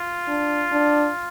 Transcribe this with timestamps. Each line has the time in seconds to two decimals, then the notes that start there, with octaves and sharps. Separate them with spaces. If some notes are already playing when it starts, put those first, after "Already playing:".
Already playing: F4
0.28 D4
0.72 D4